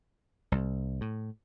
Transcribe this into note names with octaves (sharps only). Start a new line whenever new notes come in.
C2
A2